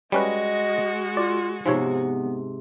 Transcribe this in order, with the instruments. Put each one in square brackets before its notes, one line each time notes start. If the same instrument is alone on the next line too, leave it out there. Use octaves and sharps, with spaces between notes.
[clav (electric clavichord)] G3 C#4 B4 [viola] G#3 F#4 [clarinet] D#5
[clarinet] F4 [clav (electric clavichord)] D5
[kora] G#2 C3 [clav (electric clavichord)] F3 C#5 [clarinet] B3